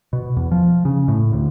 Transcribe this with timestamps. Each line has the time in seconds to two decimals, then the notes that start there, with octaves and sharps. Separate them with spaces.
0.13 B2
0.36 E2
0.52 F3
0.85 C#3
1.08 A2
1.33 D2